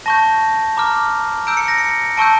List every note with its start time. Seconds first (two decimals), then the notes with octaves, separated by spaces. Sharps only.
0.06 A5 C#6 G6 A#6
0.77 A#5 D6 F6
1.47 A#5 E6 G6 D7
1.57 C#7
1.68 A#6
1.78 C#7
2.17 A5 C#6 E6 G6 D7